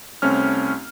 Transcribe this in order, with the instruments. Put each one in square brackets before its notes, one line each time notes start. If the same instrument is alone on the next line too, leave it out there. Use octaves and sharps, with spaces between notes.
[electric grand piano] C2 A3 C4 C#4 F6